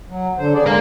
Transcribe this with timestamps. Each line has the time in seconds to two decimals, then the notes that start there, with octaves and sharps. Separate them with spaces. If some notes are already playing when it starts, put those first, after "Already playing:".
0.08 F#3
0.38 D3 C5
0.55 C#3 G#4 D5
0.66 G#3 A#4 F5